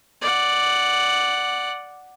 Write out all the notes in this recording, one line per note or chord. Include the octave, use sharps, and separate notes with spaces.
D5 F#5